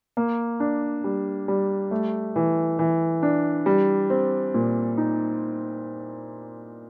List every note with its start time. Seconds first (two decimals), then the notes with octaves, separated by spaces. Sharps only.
0.17 A#3
0.60 D4
1.04 G3
1.48 G3
1.91 A3
2.36 E3
2.79 E3
3.23 D4
3.66 G3
4.10 C4
4.54 A#2
4.98 D#4